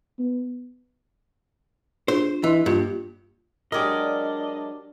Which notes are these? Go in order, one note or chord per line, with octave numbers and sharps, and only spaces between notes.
B3
D4 F4 G#4 C5
E3 D#5 C6
G2 A#3 F4
F#3 G#3 D4 G4 A#4 D5 D#5